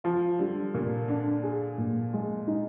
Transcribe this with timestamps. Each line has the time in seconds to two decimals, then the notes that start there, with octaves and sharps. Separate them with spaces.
0.04 F3 F4
0.39 D3 G3
0.74 A#2 A#3
1.08 D3 D4
1.43 G#4
1.78 A#2
2.13 G#3
2.47 D#4